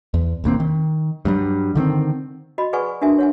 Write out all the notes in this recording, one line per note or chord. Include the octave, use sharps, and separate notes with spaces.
E2
E1 D#2 A#3 C4
D#3
G2 F#3 G3
D3 D#3 A3 C4
F#4 D#5 B5
G#4 B4 D5 F#5 G#5 C#6
D4 F#4 A#4 E5 G#5
C#5 F#5 G#5